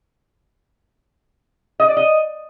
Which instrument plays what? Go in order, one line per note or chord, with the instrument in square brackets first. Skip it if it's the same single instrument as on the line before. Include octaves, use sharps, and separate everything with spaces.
[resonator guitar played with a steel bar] D#5
D5
D#5